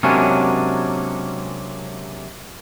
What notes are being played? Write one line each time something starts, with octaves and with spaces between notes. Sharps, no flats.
C3 F#3 G#3 A#3 C#4 D4